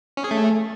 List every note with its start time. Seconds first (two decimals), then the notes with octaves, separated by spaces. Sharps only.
0.17 C#4
0.24 G#4
0.31 A3